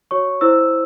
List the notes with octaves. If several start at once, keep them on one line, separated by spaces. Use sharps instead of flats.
F#4 C#5 C#6
E4 C5 E6